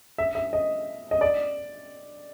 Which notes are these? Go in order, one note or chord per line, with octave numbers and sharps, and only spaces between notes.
E5
E5
D#5
D#5
D5